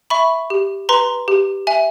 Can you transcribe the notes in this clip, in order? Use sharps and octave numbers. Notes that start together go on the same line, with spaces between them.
E5 B5 C#6
G4
B4 A#5 C6
G4
E5 G#5